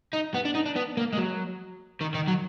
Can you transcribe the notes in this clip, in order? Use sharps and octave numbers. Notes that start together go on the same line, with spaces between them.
D#4
B3
D4
D#4
D4
B3
A#3
G#3
F#3
D#3
D#3
F#3